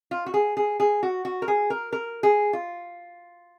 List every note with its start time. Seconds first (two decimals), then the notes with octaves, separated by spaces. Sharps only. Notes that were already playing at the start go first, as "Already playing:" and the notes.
0.11 F4
0.26 F#4
0.34 G#4
0.57 G#4
0.80 G#4
1.03 F#4
1.25 F#4
1.42 A#4
1.48 G#4
1.70 A#4
1.93 A#4
2.23 G#4
2.53 F4